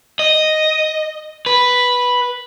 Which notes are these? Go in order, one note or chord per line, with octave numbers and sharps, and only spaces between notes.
D#5
B4